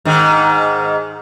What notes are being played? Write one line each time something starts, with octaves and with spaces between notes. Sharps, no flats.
G#2 D#3